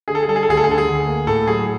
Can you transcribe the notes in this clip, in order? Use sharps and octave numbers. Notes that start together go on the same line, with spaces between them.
D3 G#4
A4
G#4
G3 A4
G#4
A4
D2 G#4
A4
G#4
D3 A4
G#4
D2
A#3
A2 A4
F#3 G#4